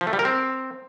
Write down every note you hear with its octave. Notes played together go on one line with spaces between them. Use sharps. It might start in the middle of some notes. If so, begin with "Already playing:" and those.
F3
A3
G3
A#4
C4